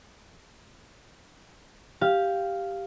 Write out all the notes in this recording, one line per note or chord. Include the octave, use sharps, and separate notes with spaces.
G4 F5